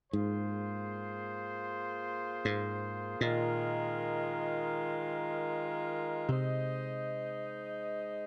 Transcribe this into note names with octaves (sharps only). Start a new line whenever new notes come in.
G#2 A#3 F4 G#4 C5
G#2
A#2 D#3 G#3 F4 A#4
C3 G#3 D#4 C5 D#5